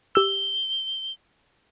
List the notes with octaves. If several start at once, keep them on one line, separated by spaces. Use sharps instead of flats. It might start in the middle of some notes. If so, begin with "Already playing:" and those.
G4 E6 G7